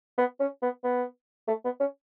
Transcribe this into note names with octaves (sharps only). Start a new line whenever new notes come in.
B3
C#4
B3
B3
A3
B3
C#4